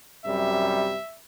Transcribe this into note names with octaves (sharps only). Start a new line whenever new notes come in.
F#2 C3 G3 E5